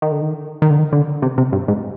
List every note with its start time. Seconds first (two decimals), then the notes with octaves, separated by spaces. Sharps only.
0.02 D#3
0.12 D3
0.21 D#3
0.62 D#3
0.71 D3
0.79 D#3
0.93 D3
1.22 C3
1.38 C3
1.52 G2
1.68 G#2